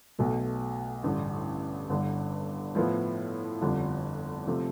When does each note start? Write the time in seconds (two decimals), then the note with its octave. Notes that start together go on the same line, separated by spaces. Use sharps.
0.18 B1 B2 A3
1.03 A1 G2 D3
1.90 G1 G2 D3
2.75 A2 F3 B3 E4
3.61 G1 F2 D3 G3 D4
4.47 C3 F3 A3